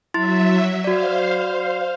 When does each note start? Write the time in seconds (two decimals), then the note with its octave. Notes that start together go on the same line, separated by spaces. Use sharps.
0.14 F#3 E4 E5 C6 A6
0.84 F#4 C5 D5 F5